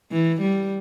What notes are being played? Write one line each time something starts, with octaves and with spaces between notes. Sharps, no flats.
E3
G3